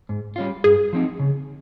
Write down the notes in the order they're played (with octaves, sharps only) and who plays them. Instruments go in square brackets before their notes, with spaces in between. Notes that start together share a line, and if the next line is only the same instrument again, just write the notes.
[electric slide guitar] G#2
G3 C#4 F4
[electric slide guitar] G2 [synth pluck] G#4
[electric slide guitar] F3 C4 D#4
C#3